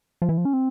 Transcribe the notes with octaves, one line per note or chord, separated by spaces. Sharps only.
F3
E3
F3
C#4
C4